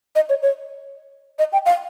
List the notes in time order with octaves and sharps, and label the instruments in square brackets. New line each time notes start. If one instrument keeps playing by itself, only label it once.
[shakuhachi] D#5
C#5
C#5
D#5
G5
F5